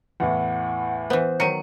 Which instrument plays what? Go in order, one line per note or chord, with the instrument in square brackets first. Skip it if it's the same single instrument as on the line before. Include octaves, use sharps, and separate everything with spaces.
[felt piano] E2 A2 [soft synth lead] F#5
[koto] E3 B3 [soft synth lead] C5
[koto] D#3 F#3 [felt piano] C#7 D#7